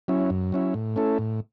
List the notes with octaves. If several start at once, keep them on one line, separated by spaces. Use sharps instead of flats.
F#3 C#4 E4
F#2
F#3 C#4 E4
A2
A3 C#4 E4 A4
A2